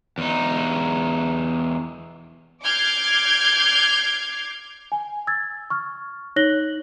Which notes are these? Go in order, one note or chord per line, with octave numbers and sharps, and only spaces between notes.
E2 D#4
D6 F6 G6 G#6 C7
G#5
E6 G#6 A6
C#6 F6
D#4 C#5 F#6 A#6 F#7 G7